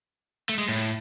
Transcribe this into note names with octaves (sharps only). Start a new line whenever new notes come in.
A3
G#3
A2